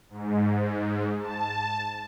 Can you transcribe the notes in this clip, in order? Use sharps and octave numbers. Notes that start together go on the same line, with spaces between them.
G#2
A5